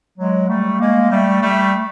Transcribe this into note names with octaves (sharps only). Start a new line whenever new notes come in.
F#3 G#3
G3 A3
G#3 A#3
G3 A3
G3 A3